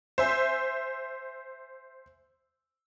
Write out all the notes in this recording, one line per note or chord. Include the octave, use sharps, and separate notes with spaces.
C5 E5 G#5